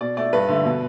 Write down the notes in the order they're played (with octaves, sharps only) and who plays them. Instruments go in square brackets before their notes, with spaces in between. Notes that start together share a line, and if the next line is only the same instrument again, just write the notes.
[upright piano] B2 D5
A3 D5
G2 B4
D3 A3
B2